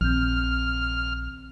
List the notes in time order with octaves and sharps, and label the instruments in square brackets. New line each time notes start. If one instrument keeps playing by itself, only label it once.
[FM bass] A#1 [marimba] D#3 C4 G6 [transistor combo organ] F6